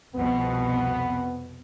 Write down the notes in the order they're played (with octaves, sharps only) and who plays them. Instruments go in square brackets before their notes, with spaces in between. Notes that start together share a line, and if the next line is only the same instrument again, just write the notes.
[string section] C2 F2 B2 [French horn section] B3